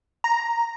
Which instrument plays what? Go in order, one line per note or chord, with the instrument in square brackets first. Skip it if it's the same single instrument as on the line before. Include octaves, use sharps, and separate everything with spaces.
[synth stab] A#5